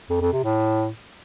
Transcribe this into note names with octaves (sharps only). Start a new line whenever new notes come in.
F2
F2
C3
A2